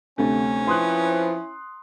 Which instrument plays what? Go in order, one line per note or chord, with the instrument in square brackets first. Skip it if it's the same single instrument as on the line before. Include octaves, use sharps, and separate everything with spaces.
[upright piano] D2 C3 A3 [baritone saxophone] C#4
[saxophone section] F3 C4 B4 [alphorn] E4 [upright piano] C6 D#6 F#6